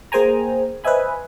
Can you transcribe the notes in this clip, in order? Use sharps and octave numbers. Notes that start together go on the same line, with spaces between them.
A#3 G#4 C5 G5 G#5 A#5
B4 C5 D#5 E5 G#5 B5